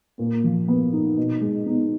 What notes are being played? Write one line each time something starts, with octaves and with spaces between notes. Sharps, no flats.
A#2 A#3
F3
B3
D#4
B2
G#3
B3 D#4